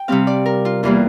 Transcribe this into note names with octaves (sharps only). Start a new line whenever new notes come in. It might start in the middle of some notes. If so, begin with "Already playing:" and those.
Already playing: G5
C3 G3 C4 F5
D5
A#4
F4
E2 E3 G3 A#3 F4